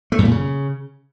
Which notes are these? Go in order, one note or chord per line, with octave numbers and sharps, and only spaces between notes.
A3
F#2
A#2
C#3